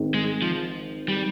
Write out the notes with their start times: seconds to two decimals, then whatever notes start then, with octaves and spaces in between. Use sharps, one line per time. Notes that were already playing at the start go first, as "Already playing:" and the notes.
Already playing: G#1 G#2 D#3
0.14 G#3
0.42 F3
1.09 G3